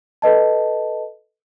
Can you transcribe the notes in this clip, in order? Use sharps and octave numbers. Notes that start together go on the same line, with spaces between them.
A4 B4 D#5 A5